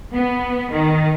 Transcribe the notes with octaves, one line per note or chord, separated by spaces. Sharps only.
B3
D#3